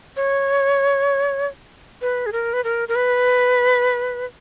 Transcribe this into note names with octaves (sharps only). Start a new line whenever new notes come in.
C#5
B4
G#4
A#4
B4
A#4
A#4
B4